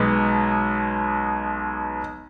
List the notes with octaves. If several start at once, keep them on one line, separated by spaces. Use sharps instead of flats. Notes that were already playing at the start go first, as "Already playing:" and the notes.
Already playing: B1 B2 G#3 B3